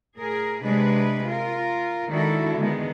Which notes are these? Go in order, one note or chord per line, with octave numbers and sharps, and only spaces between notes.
A2 G#4 A#4
C3 G#3 D4 B4
F4 A#4
D#3 G#3 D4 E4 F#4 A4
D3 D#3 G#3 B3